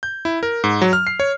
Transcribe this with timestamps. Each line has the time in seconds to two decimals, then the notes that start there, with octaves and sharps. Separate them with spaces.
0.03 G6
0.25 E4
0.43 A#4
0.64 G#2
0.82 F#3
0.93 F6
1.07 C7
1.20 C#5